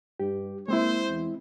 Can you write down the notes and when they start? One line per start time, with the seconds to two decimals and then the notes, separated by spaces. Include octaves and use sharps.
0.20 G2 G4
0.68 G#3 A#3 C4 E4 C5
1.09 E2